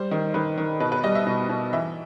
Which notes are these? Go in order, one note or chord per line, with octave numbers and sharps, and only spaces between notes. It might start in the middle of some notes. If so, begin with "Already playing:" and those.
Already playing: G3 C5
D#3
D#3 B4
D#3
B2 B4
B4
G3 D#5
E5
B2
B2
E3 E5